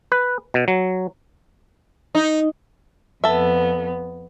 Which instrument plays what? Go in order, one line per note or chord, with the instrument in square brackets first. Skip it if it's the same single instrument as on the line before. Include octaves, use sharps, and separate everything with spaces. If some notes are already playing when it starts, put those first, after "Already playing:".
[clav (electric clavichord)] B4
B2
F#3
[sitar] D#4
[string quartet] F2 B3 [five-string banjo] A4 E5